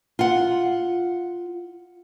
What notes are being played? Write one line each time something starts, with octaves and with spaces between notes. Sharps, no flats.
F4 F#5